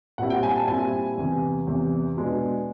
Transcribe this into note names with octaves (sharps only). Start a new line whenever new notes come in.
A#2 G3 C4 E4 F#5
G5
G#5
A5
A#2 G3 C4 E4 G#5
E2 C3 E3
E2 C3 E3
B2 G#3 B3 D4